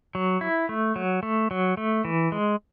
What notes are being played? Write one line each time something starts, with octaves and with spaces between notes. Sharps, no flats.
F#3
E4
A3
F#3
A3
F#3
A3
E3
G#3